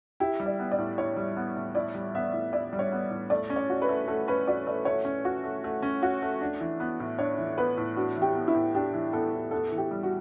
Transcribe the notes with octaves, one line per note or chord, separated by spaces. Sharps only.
E4 G4
G3
D5
B3
D5
A2
E4 C#5
G3
B3
A2
E4 D5
G3
B3 E5
A2
E4 D5
G3
C#5
B3
A2
A3 D5
C#4
C#5
F#4
B4
A3
A3 A4
C#4 B4
F#4 D5
A3 D5
A3 C#5
C#4
F#4
A3
A3
C#4
F#4
A3
D4
E3
B3
A2
D4 C#5
E3
B3 B4
A2
D4 F#4
E3
G4
B3
E4
A2
D4 G4
E3
B3 A4
A2
B3 A4
E3
G4
G3
F#4